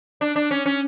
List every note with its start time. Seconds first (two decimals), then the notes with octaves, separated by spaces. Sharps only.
0.21 D4
0.36 D4
0.51 C#4
0.66 C#4